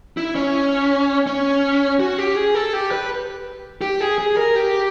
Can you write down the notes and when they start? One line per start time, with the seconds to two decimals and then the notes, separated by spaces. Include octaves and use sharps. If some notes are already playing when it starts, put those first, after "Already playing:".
0.17 E4
0.35 C#4
1.27 C#4
2.00 F#4
2.18 G4
2.36 G#4
2.55 A4
2.73 G4
2.91 B4
3.81 G4
4.00 G#4
4.18 G#4
4.37 A#4
4.55 G4